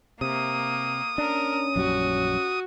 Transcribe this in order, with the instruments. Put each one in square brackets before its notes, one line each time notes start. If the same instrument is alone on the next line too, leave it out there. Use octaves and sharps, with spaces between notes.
[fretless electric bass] C3 [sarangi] A#3 [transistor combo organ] D#6
[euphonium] C#4 [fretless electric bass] D4 [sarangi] A#4
[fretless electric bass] A#1 F#2 G3 [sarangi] F#4